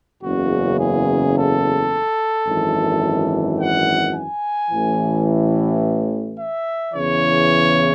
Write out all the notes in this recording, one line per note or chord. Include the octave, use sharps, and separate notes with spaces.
F#1 E2 C#3 F#4
G#4
A4
G#1 F#2 E3
F#5
G#5
A1 A2 E3
E5
E2 C#3 E3 C#5